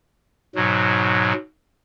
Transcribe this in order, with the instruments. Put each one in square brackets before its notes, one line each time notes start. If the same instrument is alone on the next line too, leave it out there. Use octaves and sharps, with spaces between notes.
[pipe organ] G#2 B2 F#3